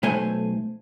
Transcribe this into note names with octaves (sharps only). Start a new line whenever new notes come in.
B1 A3 C5 G#5